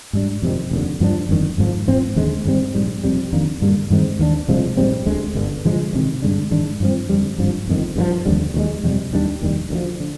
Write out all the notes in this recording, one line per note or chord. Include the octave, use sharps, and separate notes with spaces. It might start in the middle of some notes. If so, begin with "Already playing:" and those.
G#2 G3 D4
F2 C3 D#3
F1 D#2 D3
G2 F3 A#3 D4
G1 F2 D#3
G#1 G#2 F3
G#2 F3 C4
D#2 D3 G#3
G#1 G#2 G3 C4
A#1 G#2 G3
F1 F2 C3 G3
F2 D#3 A#3 D4
G2 D3 G3 A#3
G2 D#3 G#3 C4
D#2 D#3 A#3 D4
C2 C3 F3 G#3
A#1 G#2 G3 C4
D2 D3 G#3
G1 G2 D3
G2 D3 F3 G#3
D2 C3 D#3
G2 D3 G#3 D4
G#2 D#3 G#3 D4
G2 F3 C4
F2 D3 G3
G#1 G2 F3
G1 F2 D#3
G2 D3 F3
F1 D#2 D3 G3
D#2 D#3 G#3
F2 C3 G3
D#2 D#3 G3 D4
F1 D#2 D#3 G3
D2 D3 F3
D3